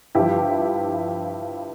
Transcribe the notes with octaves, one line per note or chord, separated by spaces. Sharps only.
G2 F3 E4 G4